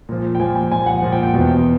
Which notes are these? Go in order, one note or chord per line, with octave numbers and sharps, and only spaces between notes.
A#2 F3
G5
A#2 F3 G#5
G#5
A#2 F3 G#5
F#5
A#2 F3
G5
G5
E2 B2